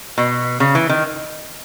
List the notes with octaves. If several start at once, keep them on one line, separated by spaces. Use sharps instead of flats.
B2
C#3
E3
D#3